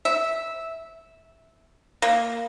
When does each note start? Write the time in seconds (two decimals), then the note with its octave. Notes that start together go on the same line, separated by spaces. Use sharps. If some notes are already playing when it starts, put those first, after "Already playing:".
0.05 E5
2.02 A#3